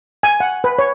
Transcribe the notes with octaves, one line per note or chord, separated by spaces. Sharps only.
G#5
F#5
B4
C#5